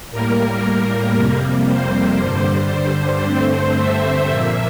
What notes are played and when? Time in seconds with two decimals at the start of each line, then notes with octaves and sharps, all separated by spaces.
0.11 A2 G3 A#3 A#4
1.14 F2 C3 G3 A#3
1.67 C5
2.19 G2 D3 G3
2.71 C5
3.23 G2 D3 A3 C4
3.76 E5
4.27 A#2 F3 A#3